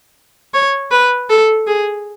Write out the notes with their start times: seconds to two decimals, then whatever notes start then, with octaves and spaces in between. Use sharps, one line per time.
0.54 C#5
0.91 B4
1.30 A4
1.67 G#4